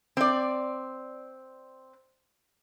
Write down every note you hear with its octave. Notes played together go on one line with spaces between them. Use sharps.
C4 D5